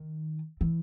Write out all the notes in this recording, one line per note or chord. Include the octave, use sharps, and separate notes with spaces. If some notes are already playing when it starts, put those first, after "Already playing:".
Already playing: D#3
E3